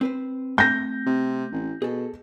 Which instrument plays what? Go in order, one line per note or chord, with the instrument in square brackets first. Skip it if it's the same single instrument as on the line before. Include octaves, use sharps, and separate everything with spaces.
[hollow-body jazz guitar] C4 B4 C5
[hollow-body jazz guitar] A3 C4 [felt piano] G6 A#6
[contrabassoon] C3
A1
[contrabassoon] B2 [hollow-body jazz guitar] G#4 A4